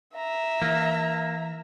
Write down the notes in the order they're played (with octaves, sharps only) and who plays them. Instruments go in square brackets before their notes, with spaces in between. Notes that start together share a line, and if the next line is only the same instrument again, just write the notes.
[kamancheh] E5 A#5
[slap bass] E3 [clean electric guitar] A#3